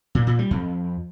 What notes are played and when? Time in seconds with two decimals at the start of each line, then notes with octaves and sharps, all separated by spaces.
0.15 A#2
0.27 A#2
0.39 G3
0.51 F2